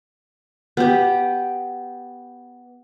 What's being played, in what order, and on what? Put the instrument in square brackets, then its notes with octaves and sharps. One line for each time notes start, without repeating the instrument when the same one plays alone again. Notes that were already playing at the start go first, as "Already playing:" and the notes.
[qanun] B3 G4